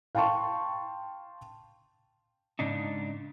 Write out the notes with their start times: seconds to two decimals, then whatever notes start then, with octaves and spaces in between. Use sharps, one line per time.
0.15 F5 G5 A5 C6 C#6
2.59 G#2 C#3 D4 D#4